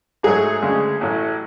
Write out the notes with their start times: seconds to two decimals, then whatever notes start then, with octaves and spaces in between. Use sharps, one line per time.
0.23 G#2 F#3 A3 G#4
0.62 D2 C#3 G#3
1.01 A1 A2 F#3 A3